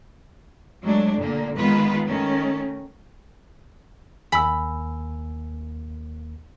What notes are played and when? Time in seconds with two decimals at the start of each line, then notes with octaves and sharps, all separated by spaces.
0.83 F#3 G#3 A3 D4
1.19 A#2 D3 A#3
1.58 D#3 G#3 B3 F4 B4
2.07 D#3 A3 C#4
4.32 D#2 A#3 G#5 B5 E6